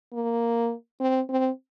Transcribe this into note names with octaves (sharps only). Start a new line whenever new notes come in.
A#3
C4
C4